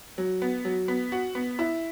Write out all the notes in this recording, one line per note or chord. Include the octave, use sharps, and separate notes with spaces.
F#3
B3
F#3
B3
F#4
B3
E4